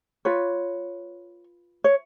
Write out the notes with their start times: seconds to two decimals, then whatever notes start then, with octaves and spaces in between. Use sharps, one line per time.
0.25 F4 B4 C#5
1.84 C#5